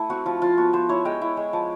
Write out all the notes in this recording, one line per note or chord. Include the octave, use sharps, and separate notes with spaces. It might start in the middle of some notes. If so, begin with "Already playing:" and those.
Already playing: A3 E4
C4 F#4
F3 F4
F3 F4
B3 F#4
B3 C5
E4 C#5
G#3 G5
E4
G#3
F3